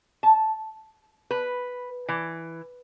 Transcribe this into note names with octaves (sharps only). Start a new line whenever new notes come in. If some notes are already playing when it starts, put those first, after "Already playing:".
A5
B4
E3